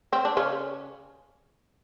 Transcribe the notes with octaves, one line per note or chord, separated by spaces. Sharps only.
C4
D4
C#3 C#4